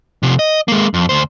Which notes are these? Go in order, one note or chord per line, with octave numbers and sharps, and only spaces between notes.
C3 F3
D#5
G#3 A#3
F2
D2 C5